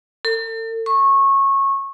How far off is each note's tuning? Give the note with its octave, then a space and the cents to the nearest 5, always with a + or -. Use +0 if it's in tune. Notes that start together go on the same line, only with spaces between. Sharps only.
A4 +40
C#6 -20